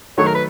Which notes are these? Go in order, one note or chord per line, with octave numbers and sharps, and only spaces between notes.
D#3 F#3 A3 C#5
A#4
B4